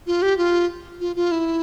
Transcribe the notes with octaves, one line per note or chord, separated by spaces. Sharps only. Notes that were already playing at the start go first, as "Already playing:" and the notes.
F4
G4
F4
F4
F4
E4